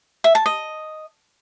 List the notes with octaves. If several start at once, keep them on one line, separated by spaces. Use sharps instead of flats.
E5
A5
D#5